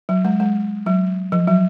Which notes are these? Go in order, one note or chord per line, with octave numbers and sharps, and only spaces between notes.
F#3
G#3
G#3
F#3
F3
F#3